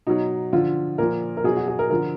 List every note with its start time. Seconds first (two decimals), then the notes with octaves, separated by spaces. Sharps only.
0.07 B2 F#3 D#4
0.53 D3 F3 F4
0.98 A#2 F3 A#4
1.37 A#4
1.44 B2 F#3 G#4
1.57 F#4
1.68 G#4
1.79 A#4
1.90 D3 F3 A#4